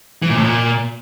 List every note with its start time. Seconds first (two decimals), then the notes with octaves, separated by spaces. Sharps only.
0.22 E3
0.30 A#2
0.37 A2
0.44 A#2